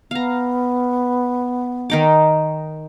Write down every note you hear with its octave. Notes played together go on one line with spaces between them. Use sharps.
B3 F5 A#5
D#3 D#4 D6